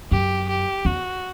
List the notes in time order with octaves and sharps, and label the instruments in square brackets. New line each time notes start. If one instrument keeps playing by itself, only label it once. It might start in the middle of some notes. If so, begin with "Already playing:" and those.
[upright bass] F#2 [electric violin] G4
[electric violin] G4
[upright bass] E2 [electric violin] F#4